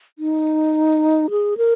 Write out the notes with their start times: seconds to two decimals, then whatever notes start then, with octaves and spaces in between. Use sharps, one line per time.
0.19 D#4
1.30 G#4
1.57 A#4